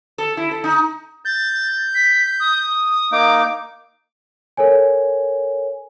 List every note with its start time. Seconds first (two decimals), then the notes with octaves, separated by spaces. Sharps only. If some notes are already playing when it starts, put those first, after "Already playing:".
0.18 A4
0.37 E4
0.51 A4
0.64 D#4
1.25 G6 A6
1.95 B6
2.40 D#6
3.12 A#3 D#4 D6
4.57 A4 A#4 C#5 G#5